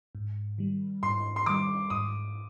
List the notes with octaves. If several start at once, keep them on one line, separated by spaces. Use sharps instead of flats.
G#2
D#3 G3
G#2 C6
C6
D#3 G3 D6
G#2 D#6